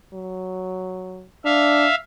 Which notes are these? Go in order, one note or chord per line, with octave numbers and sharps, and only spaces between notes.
F#3
D4 E5 F5